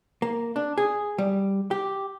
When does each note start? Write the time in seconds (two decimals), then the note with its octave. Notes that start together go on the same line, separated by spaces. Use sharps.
0.22 A#3
0.56 D4
0.78 G#4
1.18 G3
1.71 G4